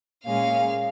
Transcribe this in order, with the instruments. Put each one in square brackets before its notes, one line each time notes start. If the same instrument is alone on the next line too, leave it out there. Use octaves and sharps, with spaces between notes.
[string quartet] A#2 G#3 C#4 F5